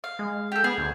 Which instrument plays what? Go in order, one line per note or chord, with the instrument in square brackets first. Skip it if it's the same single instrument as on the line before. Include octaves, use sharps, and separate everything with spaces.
[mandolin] F5
[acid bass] G#3
[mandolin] G4 A4
[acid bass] B3 [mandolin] G#4
[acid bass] D2